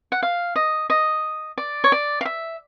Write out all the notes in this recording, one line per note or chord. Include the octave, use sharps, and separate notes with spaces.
F#5
F5
D#5
D#5
D5
C#5
D5
F5
E5